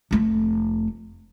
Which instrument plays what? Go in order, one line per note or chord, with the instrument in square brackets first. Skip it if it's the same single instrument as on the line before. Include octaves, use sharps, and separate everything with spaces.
[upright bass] F1 A3